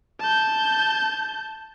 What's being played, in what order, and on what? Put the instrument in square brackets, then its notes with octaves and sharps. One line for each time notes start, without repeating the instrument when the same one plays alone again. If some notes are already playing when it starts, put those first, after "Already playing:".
[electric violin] A5 G6